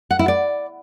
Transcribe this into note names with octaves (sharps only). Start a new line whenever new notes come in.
F#5
E4
D5